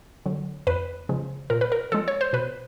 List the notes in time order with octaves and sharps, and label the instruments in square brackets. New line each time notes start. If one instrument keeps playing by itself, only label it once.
[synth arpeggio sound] D3 F#3
F2 B4
C#3 F3 G#3
A#2 A#4
B4
A#4
F3 G#3 A4
C#5
C5
B2 B4